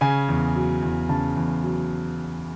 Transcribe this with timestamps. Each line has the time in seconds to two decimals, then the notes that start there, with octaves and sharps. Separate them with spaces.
0.01 C#3 G#5
0.28 E2
0.55 F#3
0.82 E2
1.09 C#3 A5
1.36 E2
1.63 F#3